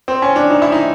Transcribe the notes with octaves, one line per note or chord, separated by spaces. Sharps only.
C4
C#4
D4
D#4
E4
D#4